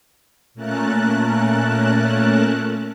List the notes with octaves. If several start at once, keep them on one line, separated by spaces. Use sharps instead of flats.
A#2 A3 C#4 A#4 A5 F#6